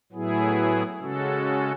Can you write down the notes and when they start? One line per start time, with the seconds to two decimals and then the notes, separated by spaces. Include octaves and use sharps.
0.12 A2 F#3 B3 E4 G#4
1.01 C#3 G#3 C#4 F#4 A4